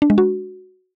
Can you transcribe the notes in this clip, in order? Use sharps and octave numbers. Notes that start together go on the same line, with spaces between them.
D4
G#3
F#4